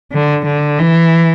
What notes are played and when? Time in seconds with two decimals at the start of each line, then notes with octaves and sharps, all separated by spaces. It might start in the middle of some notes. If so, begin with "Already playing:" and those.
0.13 D3
0.46 D3
0.79 E3